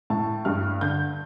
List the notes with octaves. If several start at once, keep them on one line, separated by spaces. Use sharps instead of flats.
A2 A5
G2 F6
D3 G6